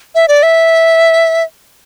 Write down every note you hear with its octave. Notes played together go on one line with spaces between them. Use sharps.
E5
D5
E5